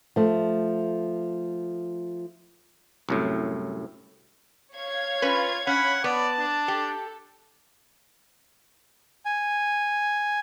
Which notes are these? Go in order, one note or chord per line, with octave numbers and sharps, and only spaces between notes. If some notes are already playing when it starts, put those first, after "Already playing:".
F3 A3
C2 F#2 A2
C#5 F5 G#6
C#4 F4 B4
C#4 F#5 B5
B3 D5 A5
D4
G4 A4
G#5